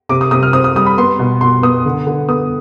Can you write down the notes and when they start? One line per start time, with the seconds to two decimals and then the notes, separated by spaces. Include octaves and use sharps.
0.09 C3 D6
0.21 D#6
0.31 C3 D#6
0.43 F6
0.53 C4 D#6
0.64 D#6
0.76 G3 D#6
0.86 B5
0.98 B3 C6
1.19 B2
1.41 B2 C6
1.63 B3 D#6
1.85 D3
2.07 D3
2.29 B3 D#6